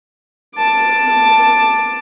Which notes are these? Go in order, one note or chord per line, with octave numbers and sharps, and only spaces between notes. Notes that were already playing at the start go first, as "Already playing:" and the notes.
A5 D6